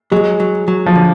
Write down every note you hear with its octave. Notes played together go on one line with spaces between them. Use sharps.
F#3 G#3
F#3
F#3
F3
D3